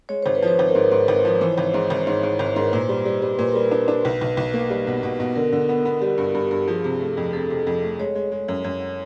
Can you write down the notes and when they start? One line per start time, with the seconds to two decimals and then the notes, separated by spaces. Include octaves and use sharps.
0.09 G#3 C#5
0.23 G#1 C5
0.35 B4
0.42 F3
0.48 C5
0.59 G#1
0.69 A#4
0.75 G#2 B4
0.91 G#2
1.08 G#1
1.25 F3
1.41 E3 C5
1.52 C#5
1.58 G#1 C5
1.74 G#2
1.90 G#1
2.07 G#2 C#5
2.23 G#2
2.39 G#1
2.55 G#2 A#4
2.64 B4
2.73 A#2 C5
2.89 G3
3.05 G3
3.22 G3
3.39 A#2 B4
3.52 G3 A#4
3.64 B4
3.71 D4
3.88 D4
4.05 B1
4.21 B1
4.37 B1
4.54 A#3
4.70 G3
4.87 B2
5.03 B2
5.20 B2
5.36 D3 A#4
5.52 D3
5.69 B3
5.85 B3
6.02 G3 G4
6.18 G2
6.34 G2
6.51 G2
6.68 F3 G#4
6.84 C3
7.00 A3
7.17 F2
7.33 C3 A4
7.50 C3
7.67 F2
7.82 A3
7.99 G#3 C#5
8.15 G#3
8.32 G#3
8.48 F#2
8.64 F#2